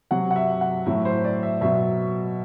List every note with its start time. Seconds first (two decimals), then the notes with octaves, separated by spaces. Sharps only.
0.11 C3 F#3 F#5
0.31 F#5
0.36 E5
0.61 F#5
0.86 A2 F#3 E5
1.05 C5
1.24 D5
1.43 E5
1.61 B2 F#3 E5